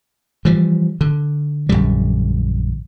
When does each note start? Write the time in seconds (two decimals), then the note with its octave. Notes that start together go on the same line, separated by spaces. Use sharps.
0.45 E3 F3 G3
1.01 D3
1.69 A#1 F#2 D3 G3